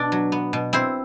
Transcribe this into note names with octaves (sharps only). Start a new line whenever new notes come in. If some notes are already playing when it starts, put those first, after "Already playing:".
Already playing: B2 D4 D5
F#3
B3
B2
C4 E4 C5